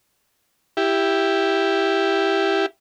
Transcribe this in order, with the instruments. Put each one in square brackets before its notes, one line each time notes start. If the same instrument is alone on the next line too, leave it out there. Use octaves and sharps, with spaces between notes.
[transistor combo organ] E4 G4